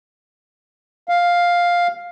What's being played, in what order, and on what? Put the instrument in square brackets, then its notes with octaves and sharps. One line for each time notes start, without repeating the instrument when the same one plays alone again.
[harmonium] F5